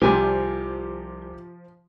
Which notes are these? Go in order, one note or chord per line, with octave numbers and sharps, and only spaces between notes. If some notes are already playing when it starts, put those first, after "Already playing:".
C2 C3 F3 G3 F4 G4 G#5